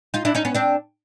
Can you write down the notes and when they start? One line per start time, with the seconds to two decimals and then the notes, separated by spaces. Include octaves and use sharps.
0.14 D#4 F4
0.25 D4 E4
0.35 C#4 D#4
0.45 B3 C#4
0.55 C4 D4